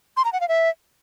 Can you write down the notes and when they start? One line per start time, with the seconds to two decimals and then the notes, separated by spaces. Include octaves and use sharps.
0.17 C6
0.25 A#5
0.33 F#5
0.41 F5
0.48 E5